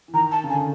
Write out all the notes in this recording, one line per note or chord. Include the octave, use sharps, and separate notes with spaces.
E3
D#3 A#5
A5
C#3
D3 G#5